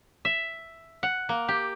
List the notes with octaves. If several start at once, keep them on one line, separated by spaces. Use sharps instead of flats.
E5
F#5
A#3
G4